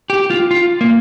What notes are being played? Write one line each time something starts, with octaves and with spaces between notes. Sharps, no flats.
G4
F4
F4
A#3